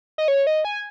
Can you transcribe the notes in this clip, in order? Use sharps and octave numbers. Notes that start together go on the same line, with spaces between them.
D#5
C#5
D#5
G#5